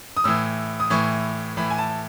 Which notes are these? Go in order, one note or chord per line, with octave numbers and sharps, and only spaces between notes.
D#6
A2 E3 E6
D#6
A2 E3 C#6
A2 E3 B5
G#5
A5